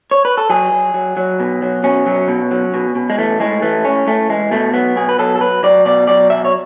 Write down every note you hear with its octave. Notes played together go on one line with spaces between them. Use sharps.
C#5
B4
A4
F#3 G#4
F#3
F#3
F#3
B2
F#3
B2 C#4
F#3
B2
F#3
B2
B2
G#3
E3 A3
A2 G#3
E3 A3
A2 C#4
A2 A3
E3 G#3
B2 A3
F#3 B3
B2 G#4
B4
F#3 A4
A4
F#3 B4
F#3 D5
B2 D5
F#3 D5
B2 E5
C#5